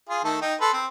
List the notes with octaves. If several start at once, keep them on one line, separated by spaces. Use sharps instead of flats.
F4 G#4
D#3 A3 A4
D#4 G5
A4 B4 C6
C4